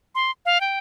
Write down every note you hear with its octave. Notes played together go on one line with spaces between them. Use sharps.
C6
F5
G5